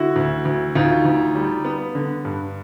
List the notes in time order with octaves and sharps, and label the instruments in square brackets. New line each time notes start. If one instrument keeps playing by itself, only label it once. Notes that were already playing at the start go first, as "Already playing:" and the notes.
Already playing: [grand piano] D3 E4 F#4
D2
D2
D2 D#4 F4
D2
G3
B3
D3
G2